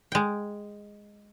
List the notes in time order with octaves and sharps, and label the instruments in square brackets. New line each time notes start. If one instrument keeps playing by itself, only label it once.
[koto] G#3 G5